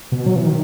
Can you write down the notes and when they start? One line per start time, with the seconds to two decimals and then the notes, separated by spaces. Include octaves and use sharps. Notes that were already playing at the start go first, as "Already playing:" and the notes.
0.12 B2
0.26 F#3
0.36 E3
0.46 D#3